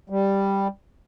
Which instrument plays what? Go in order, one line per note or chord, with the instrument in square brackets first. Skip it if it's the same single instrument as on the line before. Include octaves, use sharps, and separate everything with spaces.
[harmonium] G3